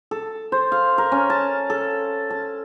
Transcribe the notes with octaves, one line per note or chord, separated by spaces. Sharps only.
A4
C5
F5
A#4
C#4
A5
A4
A5